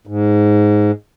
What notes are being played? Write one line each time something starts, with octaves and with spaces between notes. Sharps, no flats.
G#2